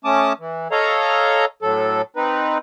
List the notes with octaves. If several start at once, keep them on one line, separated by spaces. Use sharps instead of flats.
A3 C#4 A5 D6 D#6
E3
A4 C#5 D#5 F5 A#5
A2 F#3 A4
C4 D#4 B4